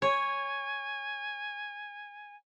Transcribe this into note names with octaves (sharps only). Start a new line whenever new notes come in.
C#5 G#5